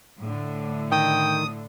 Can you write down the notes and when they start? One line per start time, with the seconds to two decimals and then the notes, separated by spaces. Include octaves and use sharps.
0.20 A2 D3
0.92 D#3 G5 D#6